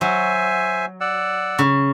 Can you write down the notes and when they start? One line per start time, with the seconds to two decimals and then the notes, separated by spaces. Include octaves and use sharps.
0.01 F#3 C5 E5 G#5
1.01 D5 F#5 E6
1.59 C#3